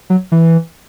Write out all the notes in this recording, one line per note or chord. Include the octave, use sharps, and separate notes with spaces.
F#3
E3